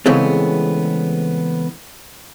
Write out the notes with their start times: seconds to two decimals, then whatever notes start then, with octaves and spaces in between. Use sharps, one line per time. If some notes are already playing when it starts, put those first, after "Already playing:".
0.06 C#3 E3 G#3 A3 B3 C4